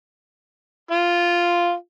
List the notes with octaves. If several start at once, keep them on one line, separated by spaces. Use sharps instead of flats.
F4